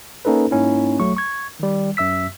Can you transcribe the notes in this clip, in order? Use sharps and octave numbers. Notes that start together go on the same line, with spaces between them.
A#3 C#4 D#4 A4 B4
G#2 A#3 C#4 D#4 E4
B1 F#3 A3 C#6
C#6 G#6
D#3 G3
F#2 E5 E6 B6